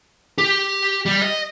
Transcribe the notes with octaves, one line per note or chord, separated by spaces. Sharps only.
G4
G3
D#5